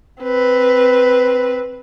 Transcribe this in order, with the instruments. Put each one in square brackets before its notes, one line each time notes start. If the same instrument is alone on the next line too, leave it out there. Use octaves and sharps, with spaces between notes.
[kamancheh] C4 B4